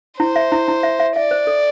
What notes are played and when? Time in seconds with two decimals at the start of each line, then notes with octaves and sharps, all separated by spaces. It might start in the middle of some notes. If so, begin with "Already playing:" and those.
0.20 E4 C5
0.36 E5
0.52 E4
0.68 E4
0.83 E5
1.00 E5
1.16 D5 E5
1.31 C5
1.47 A4